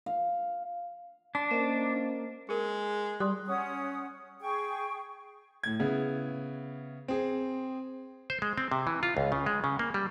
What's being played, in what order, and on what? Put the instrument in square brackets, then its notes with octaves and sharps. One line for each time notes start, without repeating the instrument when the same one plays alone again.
[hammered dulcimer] F5
[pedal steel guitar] D4 [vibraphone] C6
[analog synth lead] A#3 [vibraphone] C#4 C5 D#5
[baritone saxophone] G#3 [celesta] G#4 A#4
[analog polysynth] G3 [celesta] C6 D#6 F#6
[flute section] C#4 F#5 D#6
G#4 G5 C#6
[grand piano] A2 G#6
C#3 B3 E4
C4 G#4
[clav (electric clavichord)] C5
G#3
C4
C3
E3
F4
C#2
C#3
G#3
C#3
A#3
G3